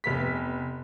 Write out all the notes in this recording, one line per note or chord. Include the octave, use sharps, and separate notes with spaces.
F1 B3 B6